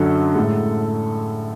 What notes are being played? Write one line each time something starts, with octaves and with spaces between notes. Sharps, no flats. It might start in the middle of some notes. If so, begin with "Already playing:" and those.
Already playing: F#2 D3 F#3 A4
A2 G#3